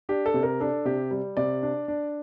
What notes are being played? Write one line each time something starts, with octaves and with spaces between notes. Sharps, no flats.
D4 G4
A4
C3
A#4
D4 A4
C3 G4
G3
C3 D5
D4
D4